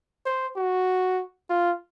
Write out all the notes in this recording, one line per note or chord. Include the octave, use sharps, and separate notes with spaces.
C5
F#4
F4